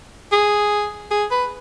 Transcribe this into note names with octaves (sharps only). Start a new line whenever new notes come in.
G#4
G#4
B4